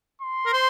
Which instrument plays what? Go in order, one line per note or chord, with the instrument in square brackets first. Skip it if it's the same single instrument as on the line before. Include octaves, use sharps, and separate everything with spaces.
[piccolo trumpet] C6
[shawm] A#4
C5